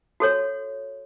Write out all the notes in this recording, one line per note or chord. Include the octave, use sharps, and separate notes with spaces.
F#4 A4 C#5